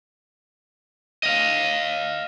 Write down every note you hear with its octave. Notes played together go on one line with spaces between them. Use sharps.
D#5 F5